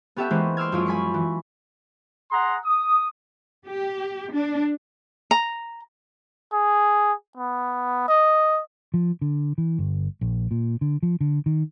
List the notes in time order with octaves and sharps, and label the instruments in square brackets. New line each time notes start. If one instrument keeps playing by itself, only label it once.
[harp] B3 C#4 G4 A4 E5 F#5
E3 G#3 A#3 B3 C#4 C5
C6 D6 E6 F6 G#6
F#2 F3 C#4 E4 F4
G#5 B5 C#6
E3
[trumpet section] G#4 F#5 A#5 C6
D#6
[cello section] G4
D4
[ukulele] A#5
[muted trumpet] G#4
B3
D#5
[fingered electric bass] F3
D3
E3
G1
A#1
A#2
D3
F3
D3
D#3